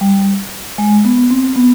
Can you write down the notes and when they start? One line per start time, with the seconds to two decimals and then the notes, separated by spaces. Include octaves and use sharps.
0.01 G3
0.78 G#3
1.05 B3
1.30 C4
1.56 B3